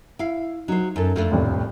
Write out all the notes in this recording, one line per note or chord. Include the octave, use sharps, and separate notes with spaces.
E4 F5
F#3 D#4 C5
F#2 A4
F2 A3 D4
D#1 C2 A2